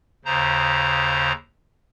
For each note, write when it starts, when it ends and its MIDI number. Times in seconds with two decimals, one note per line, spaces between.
0.25 1.32 39
0.25 1.32 49
0.25 1.32 72
0.25 1.32 82